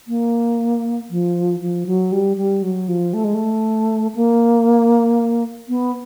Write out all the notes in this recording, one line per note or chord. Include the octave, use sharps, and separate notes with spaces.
A#3
F3
F3
F#3
G3
G3
F#3
F3
A3
G#3
A3
A#3
B3